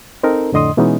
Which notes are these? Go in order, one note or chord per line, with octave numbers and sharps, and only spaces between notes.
C4 D#4 A4 A#4
F2 A2 D3 D#5 C6 D#6
B2 E3 G#3 B3 C#4 D#4